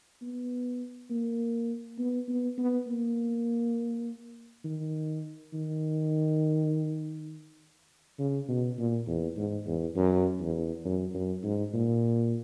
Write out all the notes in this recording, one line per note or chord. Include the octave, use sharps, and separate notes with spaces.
B3
A#3
B3
B3
B3
A#3
D#3
D#3
C#3
B2
A#2
E2
G#2
E2
F#2
E2
F#2
F#2
G#2
A#2